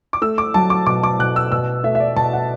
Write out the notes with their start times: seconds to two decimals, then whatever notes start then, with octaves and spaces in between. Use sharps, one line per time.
0.13 D6
0.22 A3 E6
0.38 D6
0.54 F#3 A5
0.70 D6
0.86 B2 D6
1.03 D6
1.19 B2 F#6
1.36 E6
1.52 B2 E6
1.83 A3 E5
1.95 E5
2.00 D5
2.16 B2 A5
2.33 F#5